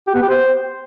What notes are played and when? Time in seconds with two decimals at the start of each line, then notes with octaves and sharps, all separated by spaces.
0.07 G4
0.15 B3
0.22 G4
0.29 C5